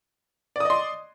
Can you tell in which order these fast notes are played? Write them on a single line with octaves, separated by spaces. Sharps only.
D5 D#6 D#5 C6